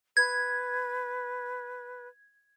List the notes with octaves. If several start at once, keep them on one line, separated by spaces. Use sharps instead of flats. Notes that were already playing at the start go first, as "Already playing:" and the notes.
B4 G#6